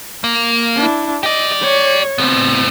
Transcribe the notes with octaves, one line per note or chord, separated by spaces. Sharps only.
A#3
D4 E4
G4 D5 D#5
C#5
A2 B3 C4